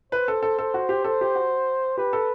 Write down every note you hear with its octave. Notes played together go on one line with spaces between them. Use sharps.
B4 C5
A4
A4
A4
F#4
G4
A4 C5
G4
F#4
G4 B4
A4